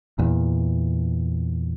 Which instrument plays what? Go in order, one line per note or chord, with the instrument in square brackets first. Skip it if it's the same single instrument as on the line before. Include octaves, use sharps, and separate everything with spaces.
[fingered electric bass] E2 A#2